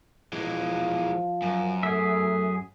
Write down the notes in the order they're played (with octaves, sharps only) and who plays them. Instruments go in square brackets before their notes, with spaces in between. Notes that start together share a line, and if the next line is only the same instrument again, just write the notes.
[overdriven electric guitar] E3 G#3 [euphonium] F3
[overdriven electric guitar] F#2
[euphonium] A3 [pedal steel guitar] G#4 E5